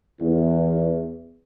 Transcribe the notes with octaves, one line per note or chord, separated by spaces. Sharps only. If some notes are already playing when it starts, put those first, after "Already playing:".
E2